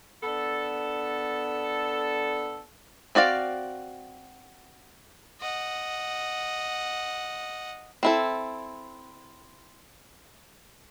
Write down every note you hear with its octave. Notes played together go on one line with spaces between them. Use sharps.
B3 D4 A4
C4 F#4 D5 F5
D#5 F#5
C4 E4 A4